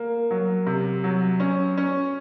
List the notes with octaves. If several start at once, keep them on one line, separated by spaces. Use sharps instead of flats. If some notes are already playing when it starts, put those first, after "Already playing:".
Already playing: A#3
F#3
C3
F#3
C#4
C#4